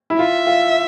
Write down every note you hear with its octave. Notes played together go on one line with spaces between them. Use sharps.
E4
F4 E5
F4